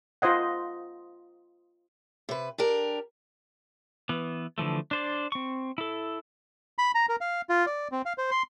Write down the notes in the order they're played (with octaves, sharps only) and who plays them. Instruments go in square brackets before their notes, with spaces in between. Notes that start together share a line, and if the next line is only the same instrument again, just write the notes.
[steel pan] F4 C5 D#5 F#5
[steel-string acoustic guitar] C3 B4
D4 G4 A#4
[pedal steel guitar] E3 B3
D3 E3 F3 A3
D4 C5 D5
C4 C#6
E4 A4
[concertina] B5
A#5
A#4
F5
F4
D5
C4
F5
C5
C6